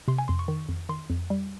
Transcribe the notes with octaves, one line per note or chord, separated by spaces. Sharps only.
C3 C6
G#5
F2 C6
C#6
D#3
F2
D#3 C6
F2
G3